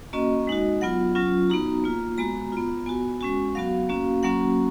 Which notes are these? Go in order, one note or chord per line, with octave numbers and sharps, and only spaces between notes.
A#3 C#4 F#4 D#5
G#3 D#4 F#4
F#3 B3 F4 F#5
F#3 C#4 F4
B3 D#4 F#4 A#5
A#3 F4
G#3 B3 F#4 A#5
B3 F4
B3 F#4 G#5
G#3 C#4 F#4 G#5
F#3 B3 F#4 F5
A#3 C#4 F#4
F#3 A#3 C#4 F#4 F#5